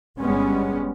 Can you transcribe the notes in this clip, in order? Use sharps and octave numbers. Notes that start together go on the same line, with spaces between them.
G1 G3 G#3 B3 C#4